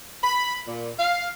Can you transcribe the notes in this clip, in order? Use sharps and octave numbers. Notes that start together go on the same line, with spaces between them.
B5
A#2
F5